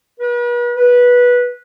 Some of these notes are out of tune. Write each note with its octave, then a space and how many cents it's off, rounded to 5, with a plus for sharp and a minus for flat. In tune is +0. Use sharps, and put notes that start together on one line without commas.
B4 -40
B4 -15